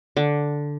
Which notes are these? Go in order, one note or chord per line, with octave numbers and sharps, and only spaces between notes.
D3